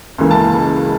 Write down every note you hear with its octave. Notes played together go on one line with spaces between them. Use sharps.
C#2 C#3 E3 A#3
A5